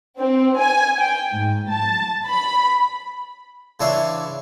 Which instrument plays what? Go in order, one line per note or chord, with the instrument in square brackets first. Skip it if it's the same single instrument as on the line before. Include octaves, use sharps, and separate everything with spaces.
[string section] C4
G#5
G5
G#2
A5
B5
[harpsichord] C#3 E3 D4 E5 C6 C#6